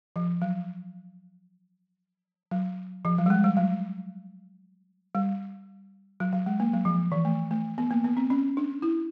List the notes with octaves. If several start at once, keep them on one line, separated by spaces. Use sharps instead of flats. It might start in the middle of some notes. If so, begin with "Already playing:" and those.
F3
F#3
F#3
F3
F#3
G3
G#3
G3
F#3
G3
F#3
F#3
G#3
A#3
F#3
F3
E3
A3
A3
B3
A#3
B3
C4
C#4
D4
E4